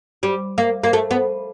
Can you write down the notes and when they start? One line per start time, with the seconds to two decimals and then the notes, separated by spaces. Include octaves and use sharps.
0.23 G3
0.58 A#3
0.84 A#3
0.93 A3
1.11 B3